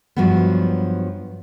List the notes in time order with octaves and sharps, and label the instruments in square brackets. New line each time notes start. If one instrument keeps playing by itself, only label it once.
[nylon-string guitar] G2 F3 F#3 G#3 B3